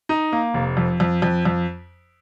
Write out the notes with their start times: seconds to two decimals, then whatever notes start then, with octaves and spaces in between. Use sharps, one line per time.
0.09 D#4
0.33 A#3
0.54 F1
0.77 F2
1.00 F2
1.22 F2
1.45 F2